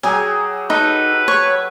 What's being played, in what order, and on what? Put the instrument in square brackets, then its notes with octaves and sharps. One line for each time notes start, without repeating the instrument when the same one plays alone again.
[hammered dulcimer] F#3 G4 G#4 [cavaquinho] G#5
[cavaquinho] D#4 [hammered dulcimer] A4 [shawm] B4
[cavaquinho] C#5